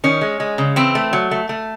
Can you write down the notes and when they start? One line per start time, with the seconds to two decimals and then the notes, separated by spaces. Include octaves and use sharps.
0.04 D#3 C#4
0.21 G#3
0.40 G#3
0.58 C#3
0.76 E3 C4
0.95 A3
1.13 F#3
1.31 A3
1.49 A3